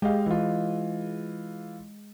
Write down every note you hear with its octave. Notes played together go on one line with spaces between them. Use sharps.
G#3 G4 D#5 F5
E3 F4